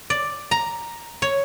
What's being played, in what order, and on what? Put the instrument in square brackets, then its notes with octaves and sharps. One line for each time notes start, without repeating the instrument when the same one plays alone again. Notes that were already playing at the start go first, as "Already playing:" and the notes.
[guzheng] D5
A#5
C#5